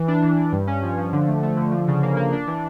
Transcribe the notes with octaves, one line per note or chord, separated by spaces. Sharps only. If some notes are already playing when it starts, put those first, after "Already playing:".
Already playing: E3
D4
E3
E3
G2
C#4
F3
F3
D3
A3
A3
D3
F3
C#3
A#3
A#3
D4
E3